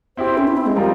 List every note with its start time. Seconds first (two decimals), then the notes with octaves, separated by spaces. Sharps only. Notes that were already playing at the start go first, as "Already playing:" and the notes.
0.17 C4 E4 G4 C5
0.37 C#4
0.47 E4
0.57 C4
0.66 G#3
0.76 F3 G3 C4 F4 A#4